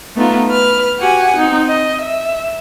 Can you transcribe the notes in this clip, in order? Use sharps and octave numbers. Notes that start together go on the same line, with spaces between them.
A3 B3 D#4 F4
B4 F6
F#4 G4 F#5 G#5
C4 D#4
D#5
E5